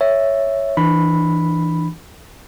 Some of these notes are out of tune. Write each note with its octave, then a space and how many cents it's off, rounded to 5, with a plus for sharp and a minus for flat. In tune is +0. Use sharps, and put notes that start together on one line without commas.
C#5 +0 E5 +0
E3 -5 D4 +25 B5 +0